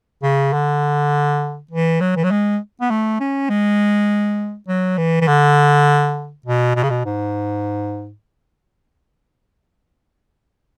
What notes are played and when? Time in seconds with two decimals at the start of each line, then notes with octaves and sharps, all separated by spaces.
0.23 C#3
0.53 D3
1.71 E3
2.01 F#3
2.16 E3
2.24 F#3
2.31 G#3
2.81 B3
2.90 A3
3.20 C#4
3.49 G#3
4.68 F#3
4.98 E3
5.21 E3
5.27 D3
6.46 B2
6.76 B2
6.83 C#3
6.90 B2
7.06 G#2